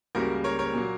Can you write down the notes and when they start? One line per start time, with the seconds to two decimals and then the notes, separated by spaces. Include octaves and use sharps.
0.15 C#2 C#3 G3 A#3 F#4 A#4
0.44 A#4 C#5
0.59 A#4 C#5
0.74 A#2 F#3 A#3